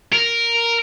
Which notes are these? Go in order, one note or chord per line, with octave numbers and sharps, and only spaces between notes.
A#4